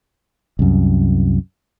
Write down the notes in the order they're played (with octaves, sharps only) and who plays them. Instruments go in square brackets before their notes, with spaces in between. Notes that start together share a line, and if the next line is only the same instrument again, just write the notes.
[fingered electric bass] C2 F#2